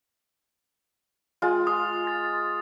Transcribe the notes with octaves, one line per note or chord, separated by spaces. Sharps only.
G#3 F4
C6 D#6
A6